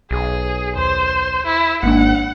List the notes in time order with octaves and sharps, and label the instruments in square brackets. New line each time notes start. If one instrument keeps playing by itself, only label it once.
[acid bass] B1 [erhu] G#4
[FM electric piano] D#2 [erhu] C5
[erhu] E4
[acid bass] G#1 [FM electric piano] G#3 A#3 D4 [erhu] F#5